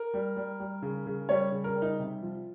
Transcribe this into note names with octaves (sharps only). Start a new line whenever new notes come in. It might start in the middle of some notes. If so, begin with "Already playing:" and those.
Already playing: A#4
G3
G3
G3
C#3
C#3
G3 C#5
C#3
A#4
G3
D#4
C3
F3